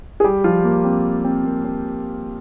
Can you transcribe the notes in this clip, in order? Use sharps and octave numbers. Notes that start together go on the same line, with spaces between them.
G#4
G3 G4
F3 F4
A#3
C4
C4
A#3
C4